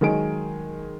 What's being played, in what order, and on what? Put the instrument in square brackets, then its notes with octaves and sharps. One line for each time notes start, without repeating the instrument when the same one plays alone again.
[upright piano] D#3 F#3 G#3 G#5 D7